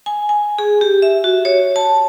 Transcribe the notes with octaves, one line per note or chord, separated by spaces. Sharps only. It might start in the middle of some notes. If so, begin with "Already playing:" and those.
G#5
G#5
G#4
G4
E5
F#4
C#5
A5